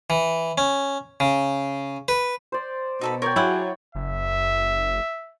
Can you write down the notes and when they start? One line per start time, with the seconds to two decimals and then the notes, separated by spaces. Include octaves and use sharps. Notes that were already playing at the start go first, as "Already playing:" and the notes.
0.10 E3
0.58 C#4
1.20 C#3
2.08 B4
2.52 C5 D5
3.01 B2 D#4 A4 B5
3.22 A#4 C#5 D5 G5
3.36 F#3 E4 G4 G#4 F#5
3.95 F#1 E5